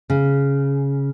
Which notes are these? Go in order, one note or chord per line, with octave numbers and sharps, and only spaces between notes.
C#3